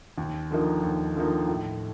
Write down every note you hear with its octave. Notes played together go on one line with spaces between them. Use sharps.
D#2
D3 F3 A#3 D#4
D#2
D3 F3 A#3 D#4
A2